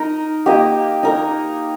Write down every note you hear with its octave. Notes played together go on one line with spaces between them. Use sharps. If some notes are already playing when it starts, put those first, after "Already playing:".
Already playing: D#4 A#4 D#5
A#3 G4 D#5
D#4 A#4 D#5